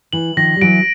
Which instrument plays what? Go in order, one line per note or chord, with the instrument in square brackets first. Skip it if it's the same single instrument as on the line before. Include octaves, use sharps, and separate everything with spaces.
[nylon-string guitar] E3 [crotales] F#7
[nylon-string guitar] D#3 F3 [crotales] A#6
[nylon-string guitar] G3
[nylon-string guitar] E3 F#3 [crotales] D7